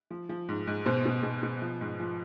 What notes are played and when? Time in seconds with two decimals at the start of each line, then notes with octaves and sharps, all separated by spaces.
0.11 F3
0.29 F3
0.49 G#2
0.67 G#2
0.86 B2 C5
1.05 B2
1.23 B2
1.43 B2
1.62 F3
1.81 G#2
2.00 F3